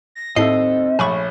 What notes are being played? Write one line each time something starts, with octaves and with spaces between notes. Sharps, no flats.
A#6
D#2 A2 C4 A4 D#5 E5 C7
A#1 A3 C#5 G#5 B5 C#6